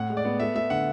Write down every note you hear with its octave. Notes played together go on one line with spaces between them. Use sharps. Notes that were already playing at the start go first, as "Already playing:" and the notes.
Already playing: A2 F#5
G#3
D5
B3
A3 E5
A3 E5
D3 F#5